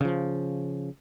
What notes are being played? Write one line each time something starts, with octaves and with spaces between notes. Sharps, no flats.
C#3 F3